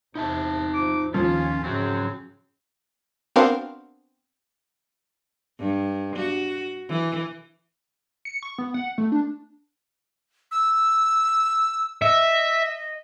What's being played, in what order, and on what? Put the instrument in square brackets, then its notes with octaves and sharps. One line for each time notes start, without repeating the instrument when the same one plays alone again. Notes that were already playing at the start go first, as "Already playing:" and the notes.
[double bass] E2 C3 [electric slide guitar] D#4 E5 A5
[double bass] F3 [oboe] D6
[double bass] D#2 [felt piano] F3 [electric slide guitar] C#4 [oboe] F4
[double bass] G#2 C#3 [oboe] C4 [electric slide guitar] C#4 F#4
[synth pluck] B3 C4 D4 F#4 A#4 F5
[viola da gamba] G2
F#4
E3
[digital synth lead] C#7
C#6
B3
F#5
A3
D4
[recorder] E6
[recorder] D#5 [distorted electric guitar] E5